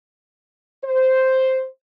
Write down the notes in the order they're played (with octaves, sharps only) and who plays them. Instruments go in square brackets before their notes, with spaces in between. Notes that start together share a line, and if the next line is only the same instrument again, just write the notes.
[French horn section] C5